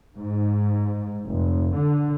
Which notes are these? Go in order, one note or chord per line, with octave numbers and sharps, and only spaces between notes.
G#2
F1
D3